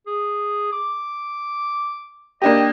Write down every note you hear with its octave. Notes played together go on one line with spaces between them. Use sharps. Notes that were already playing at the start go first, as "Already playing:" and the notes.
G#4
D6
A#3 D4 G4 D#5